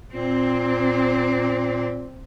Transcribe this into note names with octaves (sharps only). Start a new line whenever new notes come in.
A#2 C4